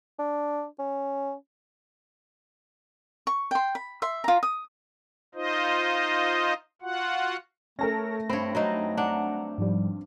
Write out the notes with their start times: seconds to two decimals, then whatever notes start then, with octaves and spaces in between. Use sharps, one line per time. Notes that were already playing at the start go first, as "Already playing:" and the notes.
0.19 D4
0.79 C#4
3.27 C#6
3.51 G5 C6
3.75 B5
4.02 E5 C6
4.24 F4 A#5
4.43 D#6
5.35 D#4 F4 C5 D#5
6.82 F4 F#4 F#5
7.79 A3 C#4 A4 A#4 A#6
8.29 G2 C4 C#5 B5
8.55 F#3 C4 D#4
8.97 D4 F#5 A#5
9.58 G#2 F3 G3